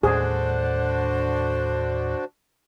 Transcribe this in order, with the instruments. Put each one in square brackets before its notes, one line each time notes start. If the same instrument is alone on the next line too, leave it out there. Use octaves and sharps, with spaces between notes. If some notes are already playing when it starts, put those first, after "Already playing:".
[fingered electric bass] D#2 A2 G3 [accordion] D3 D4 F#4 [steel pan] G#4 [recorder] C5